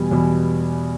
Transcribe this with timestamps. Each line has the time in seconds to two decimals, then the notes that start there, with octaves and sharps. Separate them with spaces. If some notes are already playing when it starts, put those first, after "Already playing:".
Already playing: E2 B2 G3 G#5
0.11 E2 B2 G3